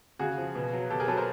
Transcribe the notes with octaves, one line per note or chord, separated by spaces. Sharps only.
C#3 F#4 G#4
F3
B2
F#3
B2 G4 A4
G#4 A#4
F#3 A4 B4
A#4 C5